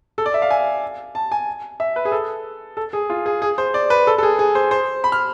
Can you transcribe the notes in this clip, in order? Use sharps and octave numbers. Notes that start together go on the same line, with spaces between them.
A4
D5
E5
F5
G#5
A5
G#5
E5
B4
G#4
A4
A4
G#4
F4
G#4
G#4
C5
D5
B4
A4
A4
G#4
G#4
C5
C5
B5
F6